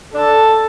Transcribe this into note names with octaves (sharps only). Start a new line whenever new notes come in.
D4 A4